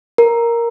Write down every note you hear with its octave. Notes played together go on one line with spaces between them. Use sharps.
A#4